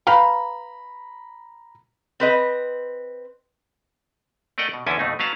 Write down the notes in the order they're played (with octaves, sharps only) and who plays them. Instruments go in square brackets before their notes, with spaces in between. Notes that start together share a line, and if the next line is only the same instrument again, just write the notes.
[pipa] B4 F5 G5 [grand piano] A#5 B5
[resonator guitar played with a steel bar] C4 B4 D#5
[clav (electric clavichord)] A3 A#4 D5 D#5 F#5 G5
B2
E2 D3 C#4 E4 A4 G#5
F2 B2 A3 D#4
F#3 C#4 B4 F5 A5 A#5